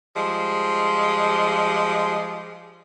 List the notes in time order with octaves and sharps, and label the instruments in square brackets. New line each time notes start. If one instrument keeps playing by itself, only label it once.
[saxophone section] F3 G3 G#3